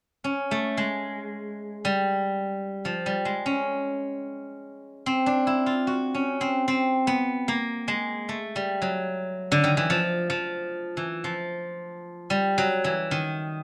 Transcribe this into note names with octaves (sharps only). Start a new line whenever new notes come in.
C#4
A3
G#3
G3
F3
G3
G#3
C#4
C4
D4
E4
F4
F#4
C#4
C4
C4
B3
A#3
G#3
A3
G3
F#3
D3
D#3
E3
F3
F3
E3
F3
G3
F#3
E3
D#3